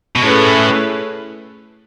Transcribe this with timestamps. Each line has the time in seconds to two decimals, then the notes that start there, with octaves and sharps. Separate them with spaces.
0.16 B2
0.22 A2 A3 C#4 E4 G#4 B4